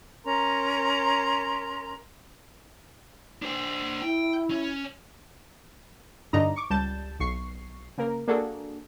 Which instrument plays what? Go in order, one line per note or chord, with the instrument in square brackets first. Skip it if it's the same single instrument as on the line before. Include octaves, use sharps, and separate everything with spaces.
[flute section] C#4 A#4 A#5 C6
[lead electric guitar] D4 C5
[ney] E4 [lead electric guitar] G5
[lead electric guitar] C#4
[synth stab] G2 D3 D4 D#4 D#5 A#5
C#6 D6
C#2 G3 A5 G6 A6 E7
B1 C#6 C7
C#3 A#3 A#4
A#3 D4 F#4 G#4 A4